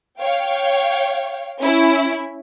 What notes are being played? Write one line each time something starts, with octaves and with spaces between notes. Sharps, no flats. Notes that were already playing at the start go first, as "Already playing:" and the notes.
C#5 F5 G5
C#4 E4